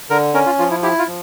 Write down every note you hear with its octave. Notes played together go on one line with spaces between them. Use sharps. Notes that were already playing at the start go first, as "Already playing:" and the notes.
D3 A#4
C#4 A#4
F4
F3 F4
E4
E4 G4
F4
F3